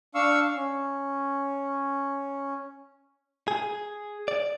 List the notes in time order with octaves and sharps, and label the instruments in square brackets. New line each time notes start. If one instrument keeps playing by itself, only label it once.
[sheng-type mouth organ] D4 F5 C#6 E6
C#4
[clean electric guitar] G#4
D5